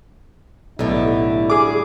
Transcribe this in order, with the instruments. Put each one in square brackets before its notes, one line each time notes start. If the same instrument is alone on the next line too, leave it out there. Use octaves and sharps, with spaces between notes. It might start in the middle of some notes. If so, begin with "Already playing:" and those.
[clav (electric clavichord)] B1 [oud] A2 D3 [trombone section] G3 E4
[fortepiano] G#4 D6